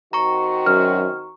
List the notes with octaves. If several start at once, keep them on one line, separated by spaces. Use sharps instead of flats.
D#3 C4 F#4 A#5 C#6
F#2 F6